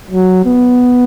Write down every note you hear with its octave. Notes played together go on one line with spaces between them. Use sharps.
F#3
B3